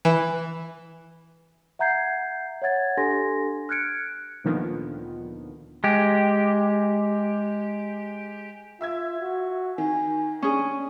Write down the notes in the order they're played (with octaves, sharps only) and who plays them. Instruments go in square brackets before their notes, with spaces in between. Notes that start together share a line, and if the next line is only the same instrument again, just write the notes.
[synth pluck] E3
[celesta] E5 F#5 A#5 G6 G#6 C7
C#5 E5 F#5 G#6 A6
D4 G4 A4 G#5 C6 A#6
F6 F#6 G#6 C#7 D7
[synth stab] D2 A#2 D3 D#3 F3 B3
[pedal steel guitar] G#3 G4
[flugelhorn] F4 [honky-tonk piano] E5 E6 G#6
[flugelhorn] F#4
[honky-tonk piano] D#3 [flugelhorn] G#5
[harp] C#4 G#4 [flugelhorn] D4